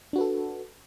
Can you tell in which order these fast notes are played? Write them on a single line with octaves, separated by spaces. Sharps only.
D4 F#4 B4 A4